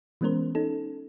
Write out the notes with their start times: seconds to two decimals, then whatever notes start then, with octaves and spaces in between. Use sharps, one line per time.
0.21 E3 G#3 B3 C#4 A#4 C5
0.55 C#4 D#4 A4